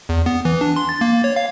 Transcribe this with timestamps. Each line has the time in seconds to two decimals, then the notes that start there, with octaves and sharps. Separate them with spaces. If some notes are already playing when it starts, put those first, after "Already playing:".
0.09 E2
0.26 B3
0.45 E3
0.61 D4
0.76 C6
0.89 A6
1.01 A#3
1.24 C#5
1.36 F5